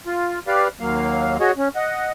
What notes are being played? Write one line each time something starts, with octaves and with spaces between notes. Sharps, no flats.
F4
G4 B4 D5 F5
D#2 F#3 A#3 F5
F#4 G#4 C#5 D#5
C#4
D#5 F#5